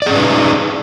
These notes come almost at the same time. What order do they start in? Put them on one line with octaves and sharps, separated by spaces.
D5 G#4 C#4 B4 D#4